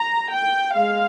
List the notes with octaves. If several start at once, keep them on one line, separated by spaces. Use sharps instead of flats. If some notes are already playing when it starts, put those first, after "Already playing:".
Already playing: A#5
G5
G#3 F5